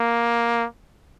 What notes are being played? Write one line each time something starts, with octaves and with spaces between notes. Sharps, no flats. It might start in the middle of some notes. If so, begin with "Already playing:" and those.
Already playing: A#3